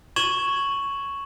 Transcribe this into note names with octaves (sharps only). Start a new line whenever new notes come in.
C#6 G#6 D#7 E7 F#7